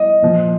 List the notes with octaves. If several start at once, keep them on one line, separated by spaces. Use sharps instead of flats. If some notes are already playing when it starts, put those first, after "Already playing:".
Already playing: D#5
A#2 F3